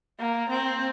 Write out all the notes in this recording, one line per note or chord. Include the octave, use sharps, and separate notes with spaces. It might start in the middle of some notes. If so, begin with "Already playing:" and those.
A#3
C4